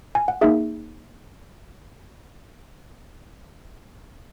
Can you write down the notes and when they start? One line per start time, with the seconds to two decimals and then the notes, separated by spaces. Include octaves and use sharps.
0.15 G#5
0.28 F#5
0.41 A#3 D#4 G#4 E5